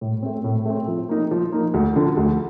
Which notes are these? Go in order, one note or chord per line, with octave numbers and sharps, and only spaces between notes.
A2
A3 C4
A2
A3 C4
F3
A#3 D#4
F3
A#3 D#4
D2
D3 F3
D2